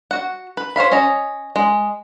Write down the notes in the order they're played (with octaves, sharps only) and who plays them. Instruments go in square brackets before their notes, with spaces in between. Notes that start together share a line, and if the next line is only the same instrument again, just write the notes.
[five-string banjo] F#4 F#5
B4
C5 C#5 F5 B5
C#4 C#5 D#5 A#5
G#3